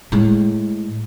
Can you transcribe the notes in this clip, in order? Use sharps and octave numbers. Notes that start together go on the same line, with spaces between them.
A2 G#3